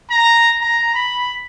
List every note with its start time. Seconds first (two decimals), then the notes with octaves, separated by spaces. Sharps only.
0.11 A#5
0.61 A#5
0.95 B5